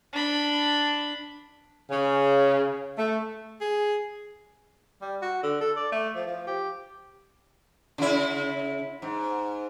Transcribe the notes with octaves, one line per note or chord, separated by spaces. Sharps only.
D4 B5
C#3
A3
G#4
G3
F#4
D3
A4
D5
A3
F3
F3
G4
C#3 E4
G#2